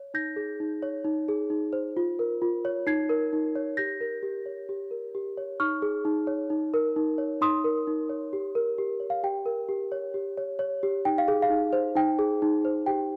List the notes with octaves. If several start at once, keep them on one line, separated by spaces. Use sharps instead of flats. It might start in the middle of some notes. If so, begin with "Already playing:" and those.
Already playing: C#5
D#4 G6 A#6
G#4
D#4
C#5
D#4
G#4
D#4
C5
F4
A#4
F4
C#5
D#4 G#6 C7
A#4
D#4
C#5
G4 G6 A#6
A#4
G4
C#5
G4
A#4
G4
C#5
D#4 C#6 F6
G#4
D#4
C#5
D#4
A#4
D#4
C#5
D#4 C6 D#6
A#4
D#4
C#5
G4
A#4
G4
C#5
F5
G4 G5
A#4
G4
C#5
G4
C#5
C#5
G4
D#4 G5
F5
G#4
F5
D#4
C5
D#4 G5
G#4
D#4
C5
G4 G5